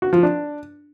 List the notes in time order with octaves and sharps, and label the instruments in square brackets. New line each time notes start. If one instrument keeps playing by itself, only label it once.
[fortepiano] F#4
F3
D4